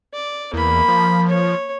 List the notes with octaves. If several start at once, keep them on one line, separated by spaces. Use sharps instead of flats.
D5
E2 A#3 B5
F3
C#5